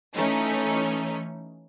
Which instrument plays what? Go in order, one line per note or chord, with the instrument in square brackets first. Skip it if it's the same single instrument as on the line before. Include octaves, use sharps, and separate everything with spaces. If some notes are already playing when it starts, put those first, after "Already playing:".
[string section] E3 A3 C#4 D#4